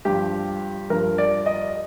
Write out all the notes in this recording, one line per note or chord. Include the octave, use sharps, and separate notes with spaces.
G2 F3 G4
G2 F3 A#4
D5
D#5